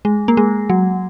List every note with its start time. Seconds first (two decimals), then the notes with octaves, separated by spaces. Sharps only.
0.05 G#3
0.28 A#3
0.37 G#3
0.70 F#3